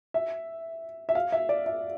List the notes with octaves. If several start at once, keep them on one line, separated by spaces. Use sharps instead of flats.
E5
E5
F5
E5
D5
E5